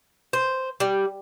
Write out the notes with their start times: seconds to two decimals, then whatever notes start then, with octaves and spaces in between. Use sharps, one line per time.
0.33 C5
0.80 G3